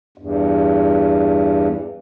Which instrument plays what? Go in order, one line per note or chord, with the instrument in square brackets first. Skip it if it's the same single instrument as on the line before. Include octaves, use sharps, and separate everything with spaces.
[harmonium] E2 G2